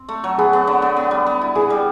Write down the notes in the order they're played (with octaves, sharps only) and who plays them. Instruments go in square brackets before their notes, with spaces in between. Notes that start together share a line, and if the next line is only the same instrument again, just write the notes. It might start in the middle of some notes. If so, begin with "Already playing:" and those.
Already playing: [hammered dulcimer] C4
A3
F#3
[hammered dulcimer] B3 [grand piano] G#4
[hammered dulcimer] B3
D3
B3
B3
G3
B3
E4
[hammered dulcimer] E3 [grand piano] G#4
[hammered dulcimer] G3